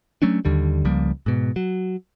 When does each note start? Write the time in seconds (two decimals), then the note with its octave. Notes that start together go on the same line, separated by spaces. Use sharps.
0.22 F#3 A3 C#4 D4
0.45 D#2 D3 G3
0.85 C#2 F3 G3 A#3
1.26 G#2 B2
1.56 F#3